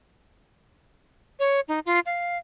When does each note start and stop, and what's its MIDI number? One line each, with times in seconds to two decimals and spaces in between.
1.39 1.60 73
1.68 1.80 63
1.86 2.00 65
2.06 2.38 77